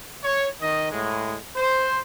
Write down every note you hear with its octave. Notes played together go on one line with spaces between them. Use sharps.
C#5
D#3 D#5
A2 G#3
C5